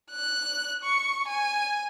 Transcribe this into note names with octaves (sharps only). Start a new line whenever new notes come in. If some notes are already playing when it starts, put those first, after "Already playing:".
F#6
C#6
G#5